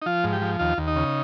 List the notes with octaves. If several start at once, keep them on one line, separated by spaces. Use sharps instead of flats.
D#4
F3 F4
G#2
G4
F3
D#2 F4
D#2
D#4
C#3